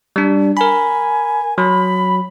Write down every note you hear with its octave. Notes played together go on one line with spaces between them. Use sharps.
G3 D4
A#4 G#5 B5
F#3 B5